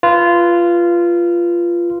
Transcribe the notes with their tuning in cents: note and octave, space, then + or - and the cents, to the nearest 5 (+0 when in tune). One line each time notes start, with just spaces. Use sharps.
F4 -15 B4 -10